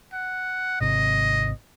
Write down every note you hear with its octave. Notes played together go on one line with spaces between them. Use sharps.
F#5
G#1 C3 D#5